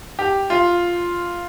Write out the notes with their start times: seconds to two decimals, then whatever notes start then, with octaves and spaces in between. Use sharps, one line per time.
0.19 G4
0.50 F4